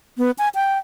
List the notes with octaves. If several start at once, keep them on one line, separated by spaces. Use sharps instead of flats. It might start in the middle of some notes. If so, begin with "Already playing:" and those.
B3
G#5
G5